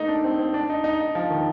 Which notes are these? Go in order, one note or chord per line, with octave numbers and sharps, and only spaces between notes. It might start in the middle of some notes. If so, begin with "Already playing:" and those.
Already playing: A3 A#3 D#4
D4
C4
C4
D4
D#4
D#4
D#4
F3
D#3